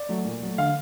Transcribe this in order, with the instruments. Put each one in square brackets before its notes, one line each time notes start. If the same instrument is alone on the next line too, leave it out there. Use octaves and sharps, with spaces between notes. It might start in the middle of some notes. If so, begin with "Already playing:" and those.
Already playing: [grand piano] D5
F#3 A3
A#2
F#3 A3
D3 F5